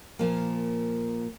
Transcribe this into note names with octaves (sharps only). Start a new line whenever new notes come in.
A#2 F3 A#3